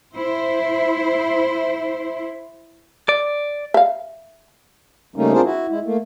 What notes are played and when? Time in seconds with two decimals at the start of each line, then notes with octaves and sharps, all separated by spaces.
0.15 E4 C5
3.09 D5
3.74 E5 F5
5.16 C#3 G3 A3 A#3 C#4 D#4
5.32 C4 D4 F4 G#4 A#4 C5
5.44 E4 F#4
5.70 G#3 E4
5.84 A3 A#3